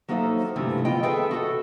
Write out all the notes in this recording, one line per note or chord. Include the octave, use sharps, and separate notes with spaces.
F#3 A#3 D#4 A4 C5 E5
G2 C3 E3 F3 A3
B3 F4 D#5 G5
G#4 A4 B4 D#5 E5 G5
F#4 A4